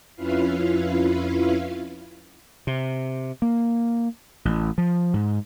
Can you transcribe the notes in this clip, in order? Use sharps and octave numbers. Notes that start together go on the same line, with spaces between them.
F2 C#4 E4 F4 B4 F5
C3
A#3
A1
F3
G#2